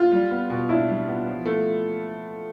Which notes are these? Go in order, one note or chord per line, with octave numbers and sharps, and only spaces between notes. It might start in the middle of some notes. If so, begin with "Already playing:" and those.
Already playing: F4
G3
B3
B2
D4 E4
G3
B3
F3
A3